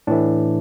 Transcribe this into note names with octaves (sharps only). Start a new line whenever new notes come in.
A2 E3 A3 D4